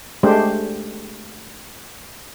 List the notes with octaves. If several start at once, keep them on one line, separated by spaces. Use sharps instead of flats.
G#3 A3 D4 G4 C5